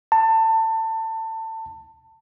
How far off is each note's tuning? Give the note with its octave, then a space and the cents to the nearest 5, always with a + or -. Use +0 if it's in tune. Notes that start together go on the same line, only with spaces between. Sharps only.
A5 +25